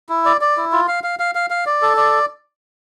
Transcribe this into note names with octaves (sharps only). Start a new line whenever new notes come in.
E4
D5
D5
E4
F4
F5
F5
F5
F5
F5
D5
A4
D5